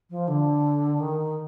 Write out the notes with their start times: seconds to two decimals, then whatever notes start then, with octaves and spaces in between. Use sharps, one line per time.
0.10 F3
0.28 D3
1.00 D#3